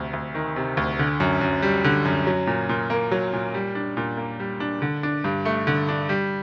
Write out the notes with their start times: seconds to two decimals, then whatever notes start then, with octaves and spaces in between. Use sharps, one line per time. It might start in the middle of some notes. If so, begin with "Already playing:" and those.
Already playing: D2 C3
0.13 D2
0.35 D#3
0.56 C3
0.77 D2
0.99 D3
1.20 F#2
1.41 F#2
1.62 G3
1.84 D3
2.05 F#2
2.27 F#3
2.47 A#2
2.69 A#2
2.90 A#3
3.12 F#3
3.33 A#2
3.54 G3
3.75 D4
3.97 A#2
4.17 A#3
4.40 G3
4.60 D4
4.82 D3
5.03 D4
5.24 G2
5.45 A3
5.67 D3
5.88 D4
6.09 G3